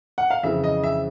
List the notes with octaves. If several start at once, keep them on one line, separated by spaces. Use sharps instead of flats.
F#5
F5
F2 C#3 E3 E5
D#5
E5